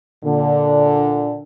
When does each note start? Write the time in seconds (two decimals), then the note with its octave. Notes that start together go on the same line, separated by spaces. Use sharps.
0.24 A#2 D3